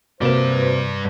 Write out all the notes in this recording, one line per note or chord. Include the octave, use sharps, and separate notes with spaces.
G2 C3 A#3 F#4 B4 C5 D5 E7